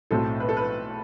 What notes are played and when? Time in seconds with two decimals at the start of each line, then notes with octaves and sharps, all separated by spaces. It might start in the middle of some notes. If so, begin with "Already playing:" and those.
0.11 B1 A2 F#3 A3 C4 A4
0.40 B4
0.49 A4
0.57 B4